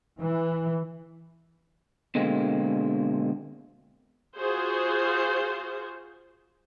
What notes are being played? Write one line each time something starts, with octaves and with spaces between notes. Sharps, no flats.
E3
B2 D3 G#3 A#3 C4
F4 F#4 G#4 C5